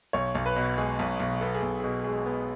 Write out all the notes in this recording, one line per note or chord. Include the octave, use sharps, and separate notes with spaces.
B1 C#5
B1
B4
B2
G#3 G#4
B1
B1
B3 A4
G#4
B1
B2 G#4
G#3 G#4
B3